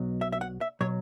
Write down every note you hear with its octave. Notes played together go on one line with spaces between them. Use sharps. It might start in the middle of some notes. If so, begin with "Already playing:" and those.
Already playing: B1 B2 F#3
E5
E5
F#5
E5
B2 F#3 C#5